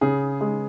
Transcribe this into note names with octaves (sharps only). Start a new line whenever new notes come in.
C#3 G#4
G#3 G#4